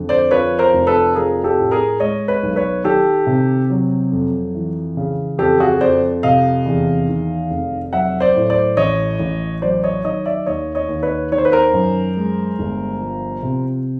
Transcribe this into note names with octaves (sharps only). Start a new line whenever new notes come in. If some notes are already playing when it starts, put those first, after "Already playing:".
Already playing: F2 D3
C5 D5
F3 B4 C#5
A#4 C5
F1
A4 B4
F3 G#4 A#4
G4 A4
A2
G#4 A#4
G#3 C#5 D#5
B4 C#5
B1
B4 C#5
D#3 G4 A4
C3
F#3
F2
E3
C#3
F2 G4 A4
F#4 G#4
F2 C5 D5
C3 D#5 F5
E2
D#3
F1
F#3 E5 F#5
C5 D5
A2
C5 D5
A1 C#5 D#5
A1
F#3 C5 D5
C#5 D#5
D#3 C#5 D#5
D5 E5
D#2 C#5 D#5
C#5 D#5
D#2
B4 C#5
D#3 C#5
C5
B4
A#4 C5
F#2
G#3
G1
F3
C3